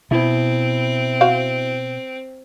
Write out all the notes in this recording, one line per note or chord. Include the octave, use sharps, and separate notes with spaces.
B2 C4 E4
F#4 C5 F5